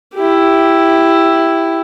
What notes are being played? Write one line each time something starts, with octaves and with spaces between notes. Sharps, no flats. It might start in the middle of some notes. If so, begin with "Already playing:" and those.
E4 G4